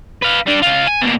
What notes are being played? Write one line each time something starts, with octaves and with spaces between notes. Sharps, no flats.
B4 F5
G3 D4
C#2 F4
G#5
B2 A#3